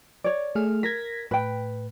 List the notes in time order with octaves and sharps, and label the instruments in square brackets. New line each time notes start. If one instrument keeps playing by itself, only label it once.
[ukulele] C#5 D5
[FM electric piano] A3 G#4 F6
[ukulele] A#4 [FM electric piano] G#6 A#6 B6
[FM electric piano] A2 [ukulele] B4 G5